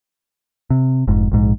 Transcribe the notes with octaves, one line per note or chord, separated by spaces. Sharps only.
C3
F1 G#2
A#1 G#2